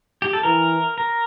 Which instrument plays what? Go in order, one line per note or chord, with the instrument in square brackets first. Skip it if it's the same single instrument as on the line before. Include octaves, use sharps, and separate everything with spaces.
[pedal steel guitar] G4
A4
[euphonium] E3 [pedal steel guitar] A#4
[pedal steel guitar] A#4